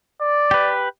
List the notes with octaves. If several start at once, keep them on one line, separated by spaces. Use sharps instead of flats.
D5
G4 B4